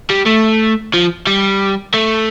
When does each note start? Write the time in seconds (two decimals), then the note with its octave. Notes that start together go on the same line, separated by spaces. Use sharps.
0.10 G3
0.26 A3
0.94 F3
1.27 G3
1.94 A3